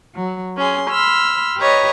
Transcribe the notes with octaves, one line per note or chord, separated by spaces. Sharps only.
F#3
C#4 G#4 C6
B5 C6 E6 F6
G4 B4 C#5 D#5 A#5